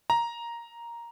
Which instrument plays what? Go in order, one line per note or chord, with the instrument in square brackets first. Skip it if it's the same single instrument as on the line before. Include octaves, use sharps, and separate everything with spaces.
[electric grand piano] A#5